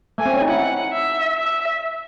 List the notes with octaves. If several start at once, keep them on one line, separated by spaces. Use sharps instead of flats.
A3 G#5
C4
C#4
D#4
E4 F#5
E5
E5